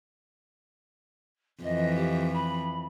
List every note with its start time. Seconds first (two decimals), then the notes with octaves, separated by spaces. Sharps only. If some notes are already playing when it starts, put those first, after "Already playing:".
1.63 F2 E3 D#5
1.96 G4
2.33 B5